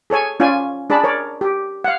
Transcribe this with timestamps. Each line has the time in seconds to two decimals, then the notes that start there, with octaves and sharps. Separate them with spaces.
0.10 G#4 A4 C#5 G#5
0.40 C#4 F4 D5 G#5
0.90 D4 G#4 D5 A5 B5
1.04 A#4 C#5 D5
1.41 G4
1.84 F5 F#5